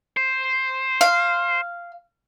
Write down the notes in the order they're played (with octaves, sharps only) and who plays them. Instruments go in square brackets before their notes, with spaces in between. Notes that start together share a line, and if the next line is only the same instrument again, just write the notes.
[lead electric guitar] C5
[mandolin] F5